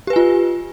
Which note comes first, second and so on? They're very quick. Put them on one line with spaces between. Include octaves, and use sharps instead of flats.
G4 B4 G#5 F4